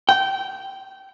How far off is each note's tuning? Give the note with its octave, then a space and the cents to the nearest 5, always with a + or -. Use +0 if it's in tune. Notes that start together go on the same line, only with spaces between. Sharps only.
G5 -20